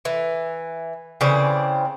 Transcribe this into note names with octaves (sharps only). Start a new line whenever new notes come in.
E3
C#3 E3 C4 D5